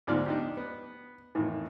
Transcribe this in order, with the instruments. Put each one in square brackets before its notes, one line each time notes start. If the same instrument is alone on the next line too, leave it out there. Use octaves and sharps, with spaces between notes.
[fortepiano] D2 G#2 F3 D5 F6
D4 D#4 G4
B3
F2 A2 D#3 E3